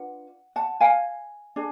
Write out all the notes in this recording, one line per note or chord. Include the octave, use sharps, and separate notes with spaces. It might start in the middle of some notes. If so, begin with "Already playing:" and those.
Already playing: D4 F4 B4 F#5
F#5 A5
F5 G#5
D4 G#4